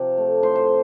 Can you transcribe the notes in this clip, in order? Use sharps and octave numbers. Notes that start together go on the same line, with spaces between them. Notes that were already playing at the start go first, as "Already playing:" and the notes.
Already playing: C3 F3 G4
A3
A2 C5
C5